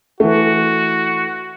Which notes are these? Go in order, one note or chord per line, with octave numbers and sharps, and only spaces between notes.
E3 A3 F#4